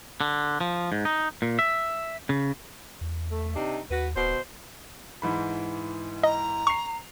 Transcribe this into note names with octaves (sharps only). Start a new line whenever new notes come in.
D3
F3
G#2
D#4
A#2
E5
C#3
E2
A3
C3 D4 D#4
D#2 F#4 B4
D1 B2 C5
G#2 E3 B5
D#5 A#5
C#6 C7 F7